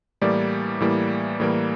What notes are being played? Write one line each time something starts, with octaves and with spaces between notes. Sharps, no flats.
A2 E3 G3 A#3 D5
A2 E3 G3 A#3
A2 E3 G3 A#3